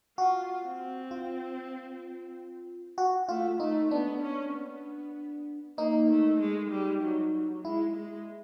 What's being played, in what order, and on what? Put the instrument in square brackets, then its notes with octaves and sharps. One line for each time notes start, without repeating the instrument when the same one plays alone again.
[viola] F4 [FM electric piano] F#4
[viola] C4
[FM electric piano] F4
F#4
[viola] A3 [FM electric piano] F4
[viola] A3 [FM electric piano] D#4
[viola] B3 [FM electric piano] D4
[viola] C#4
B3
[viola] A#3 [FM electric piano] D#4
[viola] A3
G#3
G3
F#3
F#3
[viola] G#3 [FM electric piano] E4
[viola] G#3